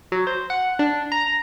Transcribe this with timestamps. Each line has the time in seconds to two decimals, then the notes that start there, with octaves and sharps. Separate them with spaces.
0.12 F#3
0.27 C5
0.50 F#5
0.79 D4
1.12 A#5